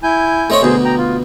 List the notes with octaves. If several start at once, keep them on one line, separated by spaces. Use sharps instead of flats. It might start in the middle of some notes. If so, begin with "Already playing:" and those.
E4 G#5 G6
A3 C4 C#5 D#5
D2 B2 G#4 C5
G5 A#5
F4